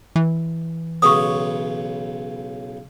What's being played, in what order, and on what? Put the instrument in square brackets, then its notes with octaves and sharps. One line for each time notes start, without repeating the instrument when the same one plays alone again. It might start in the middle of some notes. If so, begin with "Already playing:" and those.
[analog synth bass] E3
[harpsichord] B1 C#3 B3 [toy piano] C#6 D#6